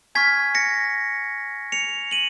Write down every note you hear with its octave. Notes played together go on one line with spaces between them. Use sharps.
G#5 C#6 F6 G#6 B6
A#6 C#7
C#7 F7
D#7 F#7